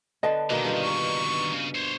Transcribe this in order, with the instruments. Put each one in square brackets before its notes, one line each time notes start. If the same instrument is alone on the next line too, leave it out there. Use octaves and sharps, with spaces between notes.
[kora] D3 B3 [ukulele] D#5 A5
[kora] B2 A#3 G5 [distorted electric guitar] D3 D#3
[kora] G2 F4
[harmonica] C#6
[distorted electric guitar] C#3
C5 C#5